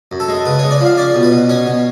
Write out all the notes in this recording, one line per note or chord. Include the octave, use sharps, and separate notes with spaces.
F#2
A4
G#3
C#3 B4
C#5
G#3
D5
F3 F5
C#4 D5
B2
B4
B2
C#4 C#5
B2